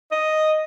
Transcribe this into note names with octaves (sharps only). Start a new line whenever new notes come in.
D#5